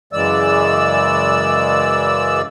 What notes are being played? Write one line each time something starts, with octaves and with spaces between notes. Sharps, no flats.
F#2 C#3 E3 G#3 D5 E6